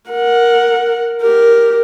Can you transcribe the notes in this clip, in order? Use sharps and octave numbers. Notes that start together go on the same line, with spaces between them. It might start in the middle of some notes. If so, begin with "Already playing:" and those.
A#4 F#5
G4 A#4